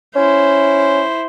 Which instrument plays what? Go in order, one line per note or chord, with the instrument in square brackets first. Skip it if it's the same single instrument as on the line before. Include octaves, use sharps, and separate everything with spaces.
[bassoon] C#4 [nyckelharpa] E4 C5